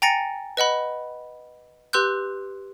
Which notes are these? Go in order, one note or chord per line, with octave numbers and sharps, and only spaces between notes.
G5 G#5 A#5 A6 A#6 C#7
B4 D#5 F#5 B5
G4 B4 C6 E6 F#6 G6